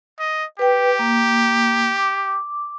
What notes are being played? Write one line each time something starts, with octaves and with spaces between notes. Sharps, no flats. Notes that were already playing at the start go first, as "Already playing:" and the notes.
D#5
G4 B4 G5
A#3
D6